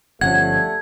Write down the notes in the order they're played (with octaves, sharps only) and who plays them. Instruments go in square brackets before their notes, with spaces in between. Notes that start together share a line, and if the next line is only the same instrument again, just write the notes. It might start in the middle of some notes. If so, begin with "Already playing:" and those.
[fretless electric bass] G1 F3 C#4 [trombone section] G3 A3 [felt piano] F#5 [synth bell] G#6